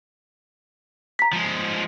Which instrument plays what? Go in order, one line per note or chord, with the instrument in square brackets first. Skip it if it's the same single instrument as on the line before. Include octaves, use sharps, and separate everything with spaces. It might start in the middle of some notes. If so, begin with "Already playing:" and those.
[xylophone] A#5 B6
[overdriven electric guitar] F3 G#3